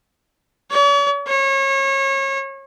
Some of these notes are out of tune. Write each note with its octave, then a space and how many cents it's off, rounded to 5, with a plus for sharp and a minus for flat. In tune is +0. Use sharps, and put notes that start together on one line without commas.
C#5 +45
C#5 -30